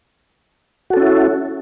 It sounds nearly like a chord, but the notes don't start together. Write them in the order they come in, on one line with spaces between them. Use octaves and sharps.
F#4 A4 C#4 E4